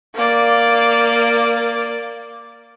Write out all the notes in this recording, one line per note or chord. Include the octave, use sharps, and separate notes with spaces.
A#3 D5